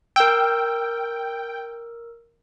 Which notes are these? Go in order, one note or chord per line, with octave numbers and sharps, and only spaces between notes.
A#4 G5 E6